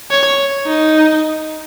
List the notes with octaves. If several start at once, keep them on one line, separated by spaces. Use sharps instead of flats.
C#5
D#4